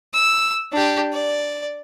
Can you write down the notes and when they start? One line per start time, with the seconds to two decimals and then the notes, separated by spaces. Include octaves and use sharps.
0.14 E6
0.72 D4 G4
1.13 D5